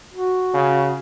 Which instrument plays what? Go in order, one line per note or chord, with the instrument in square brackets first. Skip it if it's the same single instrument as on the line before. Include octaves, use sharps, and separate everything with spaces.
[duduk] F#4
[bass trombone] C#3